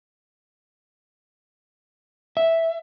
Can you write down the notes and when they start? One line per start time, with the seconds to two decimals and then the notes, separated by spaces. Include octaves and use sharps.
2.37 E5